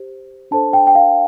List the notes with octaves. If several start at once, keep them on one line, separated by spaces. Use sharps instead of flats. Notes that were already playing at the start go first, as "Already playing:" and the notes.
Already playing: G4 C5
D4 A4 C5 A5
G5
G5
F5